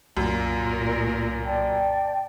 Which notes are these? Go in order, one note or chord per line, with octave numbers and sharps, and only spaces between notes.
C2 F#2 A#2 A#4
D5 G5 A5